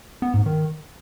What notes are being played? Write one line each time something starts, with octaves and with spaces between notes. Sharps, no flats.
B3
G#2
D#3